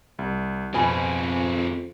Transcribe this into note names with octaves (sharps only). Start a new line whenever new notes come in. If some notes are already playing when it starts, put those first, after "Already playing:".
C2
F2 B2 C4 G#4 G#5 B5